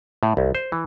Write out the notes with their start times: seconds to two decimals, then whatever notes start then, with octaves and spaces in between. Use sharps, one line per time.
0.23 A2
0.37 C2
0.55 C5
0.72 E3